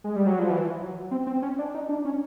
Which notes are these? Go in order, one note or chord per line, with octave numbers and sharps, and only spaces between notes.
G#3
G3
F#3
F3
E3
F#3
C4
C4
C#4
D4
D#4
D4
C#4